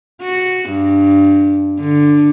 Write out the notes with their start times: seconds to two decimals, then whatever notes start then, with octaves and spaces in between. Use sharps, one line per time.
0.22 F#4
0.70 G2
1.80 D3